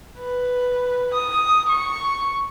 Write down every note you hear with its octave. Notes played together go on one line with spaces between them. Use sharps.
B4
D#6
C#6